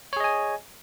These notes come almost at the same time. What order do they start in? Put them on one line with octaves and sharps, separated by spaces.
C#5 G#4 D#5 G#5